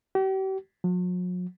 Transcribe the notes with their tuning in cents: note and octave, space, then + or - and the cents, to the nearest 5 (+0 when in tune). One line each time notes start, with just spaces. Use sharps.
G4 -40
F#3 -45